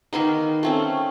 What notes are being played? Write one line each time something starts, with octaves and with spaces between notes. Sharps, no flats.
D#3 A#3 B3 D#4
A3 C4 C#4